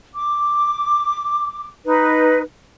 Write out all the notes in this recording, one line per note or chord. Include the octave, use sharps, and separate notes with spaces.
D6
D#4 B4